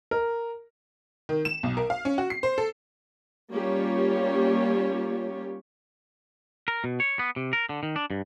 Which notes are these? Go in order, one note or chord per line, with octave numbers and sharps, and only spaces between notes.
A#4
D#3
E7
B1
A#4
F5
C#4
F#4
C7
C5
A4
G3 A#3 C#4 F4 G4 C#5
A#4
B2
C#5
B3
C3
A#4
D3
D#3
D4
G2